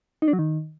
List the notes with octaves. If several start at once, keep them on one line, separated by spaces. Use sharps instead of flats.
D#4
D4
F#3
D#3